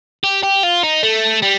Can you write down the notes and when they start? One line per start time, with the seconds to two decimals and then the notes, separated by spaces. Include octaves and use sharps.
0.24 G4
0.43 G4
0.63 F4
0.83 D#4
1.03 A3
1.43 G3